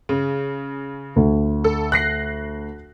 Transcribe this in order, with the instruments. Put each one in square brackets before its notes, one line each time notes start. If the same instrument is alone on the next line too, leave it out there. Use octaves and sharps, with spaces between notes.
[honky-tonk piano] C#3
[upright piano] D2
[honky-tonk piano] A4
F#6 A#6 C7